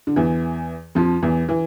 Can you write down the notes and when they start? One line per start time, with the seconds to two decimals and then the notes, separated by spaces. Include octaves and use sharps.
0.07 D3
0.16 E2 E3
0.95 F2 F3
1.23 E2 E3
1.49 E3